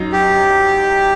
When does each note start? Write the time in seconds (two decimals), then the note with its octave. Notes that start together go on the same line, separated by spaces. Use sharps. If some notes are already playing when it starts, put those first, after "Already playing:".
Already playing: F#2 F#3 D#4
0.13 G4